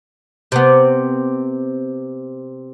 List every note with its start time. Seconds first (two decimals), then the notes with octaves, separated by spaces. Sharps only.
0.52 C3 B3